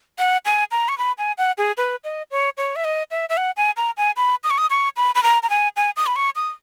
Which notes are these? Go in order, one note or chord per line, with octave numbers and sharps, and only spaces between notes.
F#5
G#5
A#5
C#6
B5
G#5
F#5
G#4
B4
D#5
C#5
C#5
E5
D#5
E5
E5
F#5
G#5
A#5
G#5
B5
D#6
C#6
D#6
C#6
B5
B5
A#5
A#5
G#5
G#5
D#6
B5
C#6
D#6